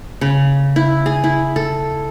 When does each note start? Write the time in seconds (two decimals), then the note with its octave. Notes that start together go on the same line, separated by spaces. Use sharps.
0.21 C#3
0.76 E4
1.06 G#4
1.24 E4
1.56 A4